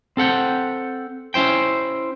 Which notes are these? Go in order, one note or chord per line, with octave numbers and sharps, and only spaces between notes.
C4 A4 F#5 G5
C#4 E4 C5 G5